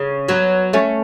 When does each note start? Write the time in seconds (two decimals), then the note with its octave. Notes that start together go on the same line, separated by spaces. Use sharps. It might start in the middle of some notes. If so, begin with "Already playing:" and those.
Already playing: C#3
0.28 F#3 B3
0.73 A3 C#4